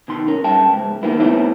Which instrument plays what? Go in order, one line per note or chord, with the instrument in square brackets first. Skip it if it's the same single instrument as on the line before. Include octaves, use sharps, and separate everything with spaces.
[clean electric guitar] B2 D#3 C6
C#4 A#4
G2 E5 G5 A5
C#2 G#2
D#3 A#3 B3 E4
A3 B3 C4 E4 C#5 E5